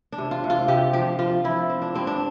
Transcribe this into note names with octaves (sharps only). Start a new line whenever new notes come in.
D4
C3
F4
C3
F4
C3 G4
F3 G4
F3 F4
F3 E4
C4
D4
G2 C4
D4